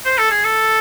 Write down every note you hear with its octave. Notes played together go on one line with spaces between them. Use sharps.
C5
A4
G#4
A4